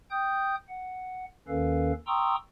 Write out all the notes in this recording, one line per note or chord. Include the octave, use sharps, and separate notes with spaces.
G5 D#6 G6
F#5
D#2 D#3 C#4 A4 B4 F5
G5 A#5 C6 C#6 D#6 E6